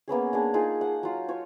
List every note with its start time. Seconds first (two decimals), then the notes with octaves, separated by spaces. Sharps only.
0.08 A#3 B3 C#4 G#4
0.33 A#3 D4 G#4
0.54 D#4 F4 G#4
0.81 F#5 A5
1.03 F#3 F4
1.28 F4 C#5